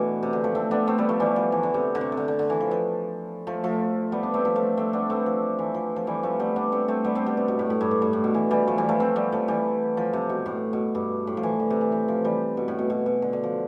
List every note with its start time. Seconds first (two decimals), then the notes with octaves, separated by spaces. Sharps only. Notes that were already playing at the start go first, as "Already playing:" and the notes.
Already playing: B2 E3 A3 D4
0.23 C3
0.33 D3
0.44 F3 A3
0.55 A3 C4
0.71 B3 D4
0.87 A3 C4
0.98 G3 B3
1.09 F3 A3
1.20 E3 G3
1.36 F3
1.52 E3
1.63 D3
1.74 C3
1.95 D3
2.01 C3
2.12 C3
2.17 D3
2.28 D3
2.39 D3
2.50 E3
2.60 F3
2.71 F3
3.47 F3 A3
3.63 F3 A3
4.12 G3 B3
4.23 B3 D4
4.34 A3 C4
4.45 F3 A3
4.55 F3 A3
4.77 A3 C4
4.93 B3 D4
5.10 A3 C4
5.26 F3
5.59 E3
5.74 F3
5.96 F3
6.07 E3 G3
6.23 F3 A3
6.40 G3 B3
6.56 B3 D4
6.72 A3 C4
6.88 A3 C4
7.04 G3 B3
7.15 A3 C4
7.26 G3 B3
7.37 C3
7.48 B2
7.59 A2
7.70 A2
7.81 G2
7.91 A2
8.02 G2
8.13 A2
8.24 B2
8.34 E3
8.51 E3 G3
8.67 F3 A3
8.78 E3 G3
8.89 F3 A3
9.00 A3 C4
9.16 G3 B3
9.32 F3 A3
9.48 E3 G3
9.97 F3
10.13 C3
10.29 B2
10.46 A2
10.73 B2
10.95 G2
11.27 A2
11.37 F3
11.43 E3
11.60 D3
11.70 C3
11.81 E3
11.92 E3
12.08 F3
12.24 E3 G3
12.57 B2
12.68 A2
12.79 B2
12.90 B2
13.06 B2
13.22 D3
13.33 D3
13.43 F3